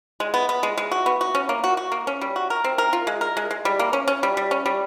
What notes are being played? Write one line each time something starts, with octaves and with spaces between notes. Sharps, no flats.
G#3
B3
B3
G#3
G#3
F#4
B3
F#4
C#4
A#3
F#4
F#4
A#3
C#4
G3
F#4
A#4
C4
A#4
F4
G#3
A#4
G#3
G#3
G3
A#3
C#4
C#4
G3
G3
C#4
G3